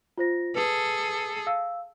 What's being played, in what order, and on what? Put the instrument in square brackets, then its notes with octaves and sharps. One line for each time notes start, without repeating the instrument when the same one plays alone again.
[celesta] F4 C5 A#6
[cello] G#4 A4 [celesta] B4
[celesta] F5 E6